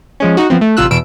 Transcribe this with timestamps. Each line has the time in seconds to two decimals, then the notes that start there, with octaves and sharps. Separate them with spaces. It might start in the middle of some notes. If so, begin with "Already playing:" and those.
0.20 F3 G#3 C#4
0.37 D#4 F#4
0.50 F3 B3 C4
0.61 A3
0.77 A1 C3 F4 E6 F#6
0.91 E2 B2 E6 D7